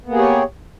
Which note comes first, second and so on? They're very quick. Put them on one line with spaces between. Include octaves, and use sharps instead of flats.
B3 A#3 G#4 G4 C#5